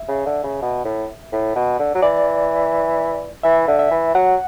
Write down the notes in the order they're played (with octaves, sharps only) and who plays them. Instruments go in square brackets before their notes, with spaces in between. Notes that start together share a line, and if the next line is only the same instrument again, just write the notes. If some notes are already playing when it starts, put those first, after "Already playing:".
Already playing: [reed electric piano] E5
[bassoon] C#3
D3
C#3
B2
A2
A2
B2
D3
F#3
[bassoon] E3 [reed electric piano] D5
[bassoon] E3 [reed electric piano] E5
[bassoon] D3
[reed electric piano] E5
[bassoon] E3
[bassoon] F#3 [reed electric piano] F#5